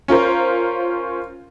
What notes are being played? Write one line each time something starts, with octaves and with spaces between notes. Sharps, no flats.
C#4 F4 A#4 C5